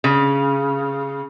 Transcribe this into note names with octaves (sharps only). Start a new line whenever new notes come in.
C#3